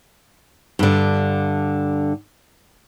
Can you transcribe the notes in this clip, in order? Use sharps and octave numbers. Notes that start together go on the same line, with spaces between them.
G2 D3